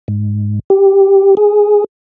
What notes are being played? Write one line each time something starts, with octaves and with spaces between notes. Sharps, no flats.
G#2
G4
G#4